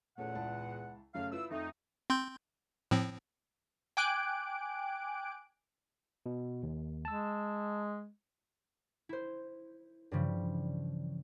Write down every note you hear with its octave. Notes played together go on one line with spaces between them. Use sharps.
E2 A#2 A3 C#4 F#5
C#2 E4 A5
F#2 C#3 A3 F5
E4 F4 B4 E6
F2 A3 D#4
C4 C6 G6
A2 F3 C4
G5 G#5 D6 F#6 D7
B2
D#2
G#3 A5 E6
E4 C5
G2 C#3 E3 F3 G3